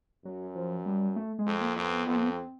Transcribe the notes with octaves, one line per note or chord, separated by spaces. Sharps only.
F#2 F#3
F3
G3
A3
G#3
F2
A#3
F2 A#3
B3
F2 B3
A#3
B3
C4